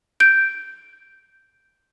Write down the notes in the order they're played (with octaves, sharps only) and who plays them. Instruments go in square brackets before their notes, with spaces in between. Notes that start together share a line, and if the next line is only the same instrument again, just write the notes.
[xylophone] G6 D7